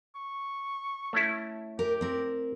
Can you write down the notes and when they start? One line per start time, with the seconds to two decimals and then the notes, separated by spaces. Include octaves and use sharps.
0.15 C#6
1.13 A3 C#4 E4
1.79 G4 A#4
2.01 C4 A#4